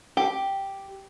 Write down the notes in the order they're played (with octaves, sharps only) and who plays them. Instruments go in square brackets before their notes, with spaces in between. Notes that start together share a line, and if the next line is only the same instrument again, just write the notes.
[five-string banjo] G4